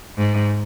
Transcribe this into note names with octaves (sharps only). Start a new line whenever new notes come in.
G#2